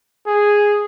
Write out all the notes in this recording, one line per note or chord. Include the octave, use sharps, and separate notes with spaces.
G#4